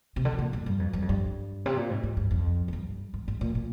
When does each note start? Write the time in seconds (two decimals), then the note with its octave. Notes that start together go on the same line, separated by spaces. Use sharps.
0.16 C3
0.25 D3
0.38 A#2
0.53 F2
0.66 G2
0.79 F2
0.93 G2
1.02 F2
1.09 G2
1.66 C3
1.77 A#2
1.90 G#2
2.03 G#2
2.17 G2
2.31 F2
2.68 F2
2.73 G2
3.14 G#2
3.28 G#2
3.41 A#2
3.55 A#2